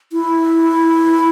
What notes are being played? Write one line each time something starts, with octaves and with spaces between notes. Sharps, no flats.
E4